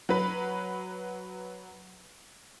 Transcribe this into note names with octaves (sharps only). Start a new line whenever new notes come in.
F#3 B4